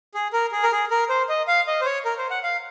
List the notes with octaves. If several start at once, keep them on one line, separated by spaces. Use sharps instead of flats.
G#4
A#4
G#4
A#4
G#4
A#4
C5
D#5
F5
D#5
C5
C#5
A#4
C5
F#5
F5